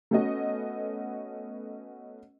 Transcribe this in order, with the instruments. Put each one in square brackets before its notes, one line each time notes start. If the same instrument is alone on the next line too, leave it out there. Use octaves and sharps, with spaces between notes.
[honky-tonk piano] A3 B3 C#4 F#4 D#5